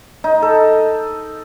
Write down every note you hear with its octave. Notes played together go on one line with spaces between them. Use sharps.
D#4
A4